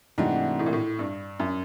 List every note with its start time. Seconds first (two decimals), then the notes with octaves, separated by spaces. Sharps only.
0.18 G#2 C3 E3 A3 D4 F#4
0.59 A2
0.66 A#2
0.73 A2
0.99 G2
1.40 F#2